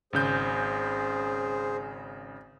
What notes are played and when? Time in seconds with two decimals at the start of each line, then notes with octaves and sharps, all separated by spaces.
0.13 G#1 C#3 G#4 C5 G6